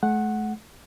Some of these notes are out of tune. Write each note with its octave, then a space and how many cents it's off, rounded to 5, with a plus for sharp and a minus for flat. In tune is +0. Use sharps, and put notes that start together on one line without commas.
A3 -40 F#5 +0